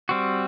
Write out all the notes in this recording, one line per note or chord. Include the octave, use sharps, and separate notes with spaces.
G3 C4 F#4